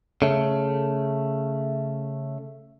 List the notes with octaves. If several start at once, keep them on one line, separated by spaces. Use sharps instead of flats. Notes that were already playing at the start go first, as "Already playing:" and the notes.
C#3 A3